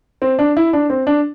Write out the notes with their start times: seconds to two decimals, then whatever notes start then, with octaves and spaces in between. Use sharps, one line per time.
0.22 C4
0.39 D4
0.57 E4
0.73 D4
0.90 C4
1.07 D4